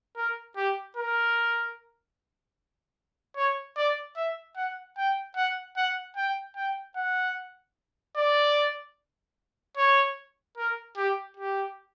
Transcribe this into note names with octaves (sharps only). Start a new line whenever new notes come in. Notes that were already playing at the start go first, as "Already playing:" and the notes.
A#4
G4
A#4
C#5
D5
E5
F#5
G5
F#5
F#5
G5
G5
F#5
D5
C#5
A#4
G4
G4